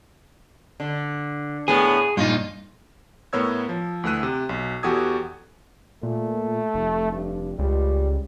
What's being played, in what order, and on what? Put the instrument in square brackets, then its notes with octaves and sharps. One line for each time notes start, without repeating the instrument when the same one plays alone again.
[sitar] D3
[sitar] A2 B3 [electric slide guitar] G#4
[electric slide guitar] G2 A#2 D#4 [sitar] F4
[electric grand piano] A2 B3 A#4 C#5 E6 G#6
F3
D2 E3 A3 E6 F#6 D#7
C3
B1
E2 F#4 G4 A4 D#6 G#6
[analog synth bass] A#2 [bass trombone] A3
[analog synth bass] F1
[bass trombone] G2
[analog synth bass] C#2 [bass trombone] G3